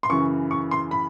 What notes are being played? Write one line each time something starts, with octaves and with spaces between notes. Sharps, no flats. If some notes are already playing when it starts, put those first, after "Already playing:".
C6
F#2 C#3 E3 C#6
C#6
C6
B5